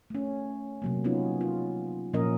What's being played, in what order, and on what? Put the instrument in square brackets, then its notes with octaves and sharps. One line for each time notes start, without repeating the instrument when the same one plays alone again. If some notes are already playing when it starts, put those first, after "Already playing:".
[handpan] A3 C#4
C3 F#3 A#3
B3 C#4 D#4 F4
F4
A#2 F3 A#3 C#4 A#4 D#5